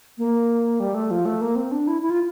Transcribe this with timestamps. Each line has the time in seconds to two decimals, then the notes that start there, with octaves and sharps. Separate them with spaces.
0.18 A#3
0.80 G3
0.94 A3
1.11 F3
1.26 A3
1.41 A#3
1.56 C4
1.72 D4
1.87 E4
2.02 E4
2.10 F4